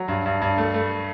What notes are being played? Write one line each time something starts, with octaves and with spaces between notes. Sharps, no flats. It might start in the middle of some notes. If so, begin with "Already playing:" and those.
Already playing: F#3
G2
G2
G2
A3
A3